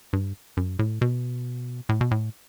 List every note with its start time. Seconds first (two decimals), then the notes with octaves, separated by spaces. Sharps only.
0.13 G2
0.57 F#2
0.79 A2
1.01 B2
1.89 A2
2.01 B2
2.11 A2